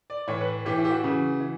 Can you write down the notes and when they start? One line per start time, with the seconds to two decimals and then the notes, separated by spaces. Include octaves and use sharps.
0.10 D5
0.28 A2 E3 C#5
0.41 B4
0.65 A2 E3 G4
0.78 E4
0.84 G4
0.90 F#4
1.03 C#3 E3
1.40 E3